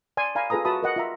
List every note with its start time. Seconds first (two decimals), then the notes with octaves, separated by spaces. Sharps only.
0.17 D5 G#5 C6
0.35 D5 F5 G#5 A#5 B5
0.50 F4 G#4 A4 B4 A#5 D#6
0.65 F#4 B4 E5 A5 B5 D#6
0.83 A#4 D#5 F#5
0.96 F4 E5 A#5